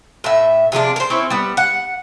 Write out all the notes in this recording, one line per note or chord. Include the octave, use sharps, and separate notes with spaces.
A2 E5
C3 F3 G#3 D4
A#4 C5
C4 C#4 E4
G3 B3
F#5